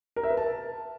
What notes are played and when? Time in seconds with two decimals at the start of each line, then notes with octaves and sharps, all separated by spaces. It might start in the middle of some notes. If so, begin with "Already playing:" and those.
0.16 A#4
0.23 E5
0.30 B4
0.37 A5